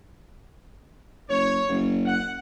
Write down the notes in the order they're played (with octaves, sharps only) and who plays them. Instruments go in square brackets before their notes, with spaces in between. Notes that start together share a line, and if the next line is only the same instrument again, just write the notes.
[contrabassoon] F#1 [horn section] C#5
[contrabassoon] F#1
[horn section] F#5